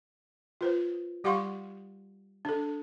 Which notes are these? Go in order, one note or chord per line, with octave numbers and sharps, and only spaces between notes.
F4 B4 C5
G3 G4 F5 F#5 C6 C#6
D4 A4